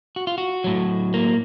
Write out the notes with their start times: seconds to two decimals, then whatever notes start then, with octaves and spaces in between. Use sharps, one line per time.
0.16 F#4
0.27 F4
0.38 F#4
0.64 A2 F#3
1.14 A#3